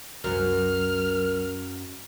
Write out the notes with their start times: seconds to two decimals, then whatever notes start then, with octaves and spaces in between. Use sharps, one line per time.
0.24 C2 F#2 F#3 A#4 F6